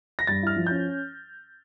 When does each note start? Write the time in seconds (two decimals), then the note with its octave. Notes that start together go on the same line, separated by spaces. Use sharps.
0.19 A#6
0.27 G2 A6
0.43 E4 F6
0.56 F3
0.67 C#4 G6